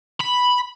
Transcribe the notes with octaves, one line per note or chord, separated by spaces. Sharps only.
B5